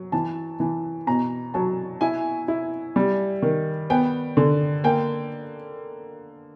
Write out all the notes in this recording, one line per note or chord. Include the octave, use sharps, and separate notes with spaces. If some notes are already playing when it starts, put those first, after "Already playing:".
Already playing: F#3
E3 A5
E3
B2 A#5
F#3 A5
E4 G#5
E4
G3
D#3
B3 G5
D3
A#3 G5